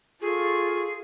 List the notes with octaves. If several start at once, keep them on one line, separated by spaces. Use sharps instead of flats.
F4 G#4 A4 C#6